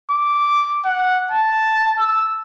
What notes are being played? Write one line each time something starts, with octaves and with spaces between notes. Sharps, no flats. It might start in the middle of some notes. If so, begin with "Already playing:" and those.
D6
F#5
A5
E6